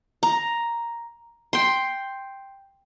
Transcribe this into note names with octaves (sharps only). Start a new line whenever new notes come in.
A#5
G5 C6